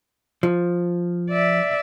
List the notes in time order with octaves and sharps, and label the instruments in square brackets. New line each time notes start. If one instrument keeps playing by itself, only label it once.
[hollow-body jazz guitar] F3
[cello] D5 E5